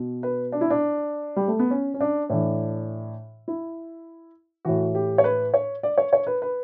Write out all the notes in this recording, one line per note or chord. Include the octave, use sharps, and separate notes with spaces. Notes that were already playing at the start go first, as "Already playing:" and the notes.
Already playing: B2
B4
D4
E4
D4
G3
A3
B3
C#4
C#4
D4
A2 E3 D4
E4
A2 E3 F#4
G4
C#5
B4
C#5
D5
C#5
C#5
B4
B4